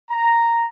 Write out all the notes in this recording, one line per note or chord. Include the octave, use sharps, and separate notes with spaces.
A#5